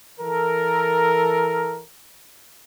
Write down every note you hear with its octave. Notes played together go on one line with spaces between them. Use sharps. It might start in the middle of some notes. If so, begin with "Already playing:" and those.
E3 A4 A#4